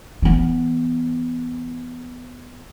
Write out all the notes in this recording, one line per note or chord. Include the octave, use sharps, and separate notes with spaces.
E3 B3